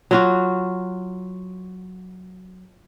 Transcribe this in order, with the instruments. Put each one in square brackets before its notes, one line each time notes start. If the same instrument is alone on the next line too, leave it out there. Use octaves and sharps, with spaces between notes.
[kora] F#3 F4 F#4